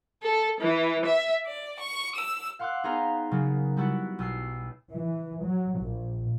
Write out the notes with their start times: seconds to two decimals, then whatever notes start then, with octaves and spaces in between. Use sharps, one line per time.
0.23 A4
0.60 E3
1.05 E5
1.46 D5
1.78 C#6
2.15 E6
2.59 F5 F#5 C6 D6 E6 F#6
2.84 B3 D#4 G#4 C5 F5 A#5
3.31 C#3 F#3 A#3 B3
3.77 G3 B3 E4 F#4
4.19 B1 E6 C7
4.92 E3
5.45 F#3
5.80 A#1